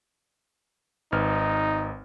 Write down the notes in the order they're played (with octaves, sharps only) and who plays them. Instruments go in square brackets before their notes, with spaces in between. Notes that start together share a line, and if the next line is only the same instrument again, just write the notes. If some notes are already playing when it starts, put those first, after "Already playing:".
[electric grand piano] G#1 B4 F6 [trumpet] D#4